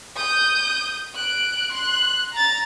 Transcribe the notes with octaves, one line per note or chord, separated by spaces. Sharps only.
D#6 G6
F#6 D7
C6 F#6
A#5 A6